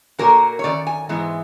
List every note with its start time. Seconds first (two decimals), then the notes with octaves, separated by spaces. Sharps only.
0.19 A#2 F#3 A#3 A#4
0.59 C#5
0.64 F#2 D#3 D5
0.87 G#5
1.09 G#2 E3 G#3 B3